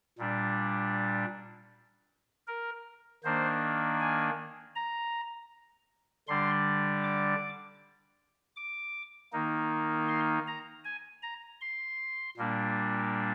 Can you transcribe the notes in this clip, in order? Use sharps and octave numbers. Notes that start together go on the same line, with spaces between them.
A#2 G3 D4
A#4
D#3 A#3 D4 C5
G#5
A#5
D3 G3 D4 C6
D6
D6
D#3 A#3 D#4
C6
A#5
G#5
A#5
C6
A#2 G3 A#3 D4